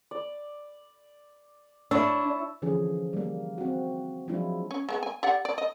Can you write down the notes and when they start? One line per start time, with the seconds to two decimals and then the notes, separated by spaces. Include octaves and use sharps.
0.11 D5
1.91 D4 E4 C#5 E6
2.62 D3 E3 F3 C#4 G#4
3.13 G3 A#3
3.58 C4 F#4
4.28 F3 F#3 G#3 D4 E4 F4
4.71 C#4
4.89 G#3 B3
5.03 G#5
5.23 G4 D5 F#5
5.45 D5
5.58 D#5